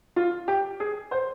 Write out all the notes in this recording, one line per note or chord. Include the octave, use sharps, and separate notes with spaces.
F4
G4
G#4
C5